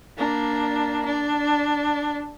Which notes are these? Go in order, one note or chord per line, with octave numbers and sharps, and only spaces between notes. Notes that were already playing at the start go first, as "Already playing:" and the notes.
A#3 D4
D4